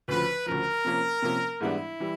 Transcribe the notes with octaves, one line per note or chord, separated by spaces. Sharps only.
D2 C#3 F3 B4
D2 C#3 F3 A#4
C3 F3 A#3 C#4
C3 F3 A#3 C#4
G#2 E3 G3 B3 D4 E4
E3 G3